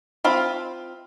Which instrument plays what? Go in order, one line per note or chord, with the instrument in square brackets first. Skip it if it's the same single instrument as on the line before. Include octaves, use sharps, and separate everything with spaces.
[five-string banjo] C4 F4 B5